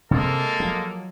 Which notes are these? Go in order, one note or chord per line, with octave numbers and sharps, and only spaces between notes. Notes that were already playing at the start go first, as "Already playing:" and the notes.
C3 G#3 A#3 A4
F3 F#3